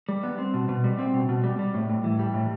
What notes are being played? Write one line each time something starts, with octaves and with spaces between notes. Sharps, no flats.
G3
B3
C4
B2
B2
G3
C4
B2
B2
G3
G3
A2
A2
E3
G3
A2